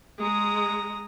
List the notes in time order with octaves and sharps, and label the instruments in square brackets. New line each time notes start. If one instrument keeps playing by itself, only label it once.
[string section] G#3 [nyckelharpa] A#5 D#6